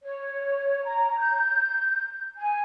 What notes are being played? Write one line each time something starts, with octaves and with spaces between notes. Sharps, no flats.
C#5
A#5
G6
G#5